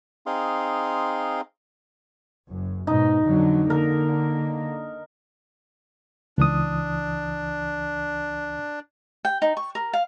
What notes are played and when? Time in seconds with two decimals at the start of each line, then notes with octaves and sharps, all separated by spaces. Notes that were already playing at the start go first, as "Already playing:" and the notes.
0.26 C4 D#4 G#4 F5 C6
2.48 F#1 F#2
2.87 G#2 B2 D#4
3.25 F2 D3 F#3
3.70 D3 A#3 A#4
6.38 C#2 E3 D4 D#6
9.25 G5
9.42 D#4
9.57 C#6
9.75 A#4
9.93 F5